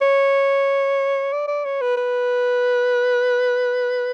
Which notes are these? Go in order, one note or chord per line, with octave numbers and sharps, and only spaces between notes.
C#5
D5
D5
C#5
B4
B4